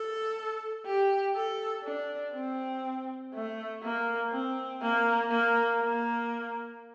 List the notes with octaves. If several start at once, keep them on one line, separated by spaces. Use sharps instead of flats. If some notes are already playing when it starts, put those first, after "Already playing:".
Already playing: A4
G4
A4
D4
C4
A3
A#3
C4
A#3
A#3
A#3